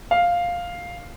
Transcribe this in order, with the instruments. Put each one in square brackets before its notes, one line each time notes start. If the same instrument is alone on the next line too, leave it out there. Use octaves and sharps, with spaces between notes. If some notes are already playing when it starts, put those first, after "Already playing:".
[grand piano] F5